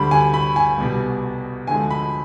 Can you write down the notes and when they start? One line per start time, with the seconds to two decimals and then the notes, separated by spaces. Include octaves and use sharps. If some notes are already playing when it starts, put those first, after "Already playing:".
Already playing: D2 D3 G3 B5
0.11 G#5
0.34 B5
0.56 G#5
0.78 C2 B2 G3
1.67 D2 D3 F3 G#3 G#5
1.90 B5